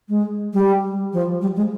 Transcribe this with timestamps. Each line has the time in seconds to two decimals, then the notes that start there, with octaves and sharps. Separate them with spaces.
0.09 G#3
0.53 G3
1.13 F3
1.42 G3
1.56 G#3